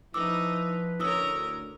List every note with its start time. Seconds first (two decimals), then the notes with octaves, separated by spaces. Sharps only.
0.14 F3 D#4 E4 B4 D6 E6
1.00 D2 C#4 E4 A#4 D#6 E6